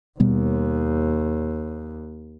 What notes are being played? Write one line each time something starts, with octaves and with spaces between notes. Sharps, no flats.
D#2 B2 G3 B3